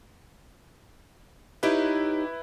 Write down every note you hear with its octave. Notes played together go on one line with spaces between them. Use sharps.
D#4 E4 G4 B4 C#5